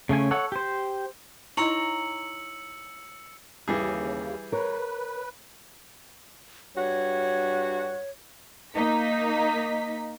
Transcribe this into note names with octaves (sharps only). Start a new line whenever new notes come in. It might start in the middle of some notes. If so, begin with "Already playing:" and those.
C#3 A3 C#4 G#5
A4 C#5 F#5
G4 C5
D#4 E4 C#5 D#5 A#5 E6 C#7 F#7
D#2 C#3 E3 G3 G#4
A#4 B4 C#5
G2 F#4 C#5
A#3 D#4 B6